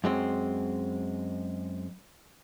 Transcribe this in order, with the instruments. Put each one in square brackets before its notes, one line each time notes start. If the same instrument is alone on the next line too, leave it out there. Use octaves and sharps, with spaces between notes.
[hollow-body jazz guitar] F#2 G#3 C4